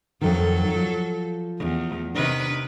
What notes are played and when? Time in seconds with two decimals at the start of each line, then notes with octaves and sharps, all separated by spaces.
0.21 F2 D#3 F#3 A4
0.75 F3
1.58 E2
2.15 C3 D#3 D4 B4